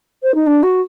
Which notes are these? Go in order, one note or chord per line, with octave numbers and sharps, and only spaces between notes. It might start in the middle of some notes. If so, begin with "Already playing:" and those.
C5
D#4
D4
F#4